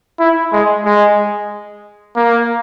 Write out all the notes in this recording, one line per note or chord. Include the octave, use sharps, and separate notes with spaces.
E4
G#3
G#3
A#3